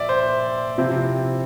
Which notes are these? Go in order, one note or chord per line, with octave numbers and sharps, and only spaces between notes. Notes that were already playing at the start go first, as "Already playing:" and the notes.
Already playing: A#2 D5 E5
C5
C3 F3 C4 E4